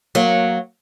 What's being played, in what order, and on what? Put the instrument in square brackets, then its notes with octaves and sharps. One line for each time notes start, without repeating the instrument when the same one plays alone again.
[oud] F#3 A#3